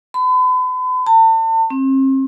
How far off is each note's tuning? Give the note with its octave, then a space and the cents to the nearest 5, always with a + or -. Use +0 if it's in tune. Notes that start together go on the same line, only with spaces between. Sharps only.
B5 +40
A5 +40
C4 +40